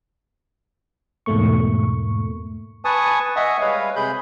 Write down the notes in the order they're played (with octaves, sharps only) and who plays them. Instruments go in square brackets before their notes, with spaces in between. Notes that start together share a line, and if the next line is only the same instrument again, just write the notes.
[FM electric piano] E2 G#2 B2 A3 A#3 C#6
[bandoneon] B4 G#5 A5 C#6 D#6
D#5 E5 F#5 G#5 C#6 D#6
G3 G#3 B4 C#5 F5
C3 G#4 B5 G6